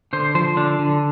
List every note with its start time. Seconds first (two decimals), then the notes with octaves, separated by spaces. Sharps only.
0.13 D3 C5
0.35 F3 C5
0.57 D3 D4
0.79 D3